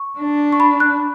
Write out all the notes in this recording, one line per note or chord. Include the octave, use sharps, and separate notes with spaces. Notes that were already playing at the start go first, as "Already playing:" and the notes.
Already playing: C#6
D4
C#6
B5
F#6